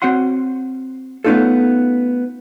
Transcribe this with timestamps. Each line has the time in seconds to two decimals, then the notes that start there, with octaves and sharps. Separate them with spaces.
0.02 C4 F#4 C#5 F#5 C6
1.24 A3 B3 C#4 D#4 F4 A4